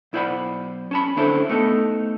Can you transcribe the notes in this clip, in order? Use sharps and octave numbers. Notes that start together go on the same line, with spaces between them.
B1 E4 C5 D5 F#5 B5
C#4 A5 B5
D2 C#4 D4 E4 A4 C5
A3 B3 D#4 G4 A4